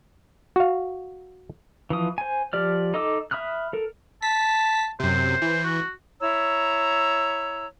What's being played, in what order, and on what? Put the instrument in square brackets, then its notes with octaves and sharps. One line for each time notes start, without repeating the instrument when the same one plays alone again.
[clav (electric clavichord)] F#4 F5
[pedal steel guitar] E3 F3 D#6
C5 G#5
F3 G4 D5 F6
D#4 A4 D#5 D6 E6
E5 B5 D#6 F6 F#6
A4 A#4
[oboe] A5 [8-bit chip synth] B6
[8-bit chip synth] F#2 C3 [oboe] C5
[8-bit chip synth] E3
[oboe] F#4
[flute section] E4 C#5 A#5 E6